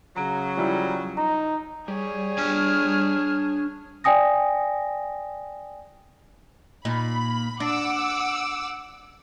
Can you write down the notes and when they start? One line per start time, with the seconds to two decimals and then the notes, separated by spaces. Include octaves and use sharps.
0.16 C#3 F#3 A#5
0.57 F3 G3 E4
1.17 D#4 A#5
1.88 G3 G#4 C#5
2.38 D4 G#5 F6
4.04 D5 G5 G#5 D#6 A#6
6.85 A#2 D#4 B5
7.60 D4 F#5 D6 E6